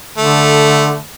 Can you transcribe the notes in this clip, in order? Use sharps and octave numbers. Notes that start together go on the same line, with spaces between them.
D3 A3